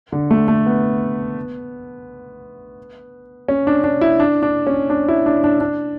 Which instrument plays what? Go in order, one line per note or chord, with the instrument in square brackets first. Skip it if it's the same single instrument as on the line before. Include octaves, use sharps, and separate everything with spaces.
[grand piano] D3
A3
A3
B3
C#4
D4
D4
E4
D4
D4
C#4
D4
E4
D4
D4
D4